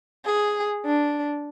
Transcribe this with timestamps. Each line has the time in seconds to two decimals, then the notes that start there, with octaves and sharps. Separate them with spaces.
0.24 G#4
0.85 D4